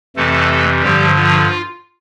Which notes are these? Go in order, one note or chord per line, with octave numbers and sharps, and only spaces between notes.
F2 C3 E3 A3 A4
G2 D3 F3 G3 G4
F3 F4